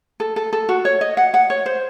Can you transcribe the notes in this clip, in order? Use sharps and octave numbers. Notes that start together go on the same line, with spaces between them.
A4
A4
A4
F#4
C#5
D#5
F#5
F#5
C#5
C5